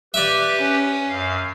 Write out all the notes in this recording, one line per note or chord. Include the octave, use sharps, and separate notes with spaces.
G4 B4 D5 E5
C#4
F#2 F5